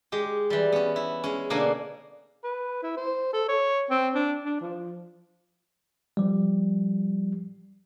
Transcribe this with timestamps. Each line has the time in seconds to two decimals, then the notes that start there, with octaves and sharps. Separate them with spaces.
0.12 G#3 G4
0.50 E3 G3
0.72 B3 C#4
0.96 E4
1.24 G#3 C#4
1.50 B2 D3 A#3 D4 A#4 G#5
2.44 B4
2.83 E4
2.97 C5
3.33 A4
3.48 C#5
3.90 C4
4.15 D4
4.45 D4
4.61 F3
6.17 F3 G3